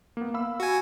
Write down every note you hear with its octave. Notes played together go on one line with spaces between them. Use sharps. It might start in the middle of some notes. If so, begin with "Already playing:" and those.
A#3 B3
F5 B5 E6
F#4 G#5